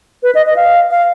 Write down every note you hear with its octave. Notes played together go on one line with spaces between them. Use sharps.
B4
D#5
D#5
F5
F5